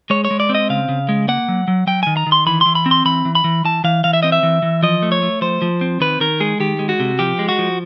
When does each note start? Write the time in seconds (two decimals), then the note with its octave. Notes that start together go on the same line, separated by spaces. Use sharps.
0.10 G#3 C#5
0.25 C#5
0.31 G#3
0.40 D5
0.49 C4
0.55 D#5
0.70 C#3 F5
0.89 C#3
1.09 G#3
1.28 A#3 F#5
1.49 F#3
1.68 F#3
1.87 F#3 G5
2.03 D#3 G#5
2.17 A#5
2.27 D#3
2.32 C6
2.46 E3 B5
2.61 E3 C6
2.75 B5
2.86 C4
2.91 C6
3.05 E3 B5
3.25 E3
3.35 B5
3.44 E3
3.64 E3 A5
3.84 E3 F5
4.04 E3 F5
4.13 E5
4.23 C4 D#5
4.32 E5
4.43 E3
4.62 E3
4.83 F3 D#5
5.02 A3
5.12 C#5
5.22 A3
5.41 F3 C5
5.62 F3
5.81 C4
6.00 D#3 B4
6.20 D#3 A#4
6.40 G#3 G#4
6.60 D#3 G4
6.79 G#3
6.89 F#4
7.00 C3
7.19 F3 G4
7.39 G#3
7.49 F#4
7.59 F3